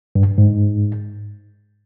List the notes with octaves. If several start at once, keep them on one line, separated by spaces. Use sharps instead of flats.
G2
G#2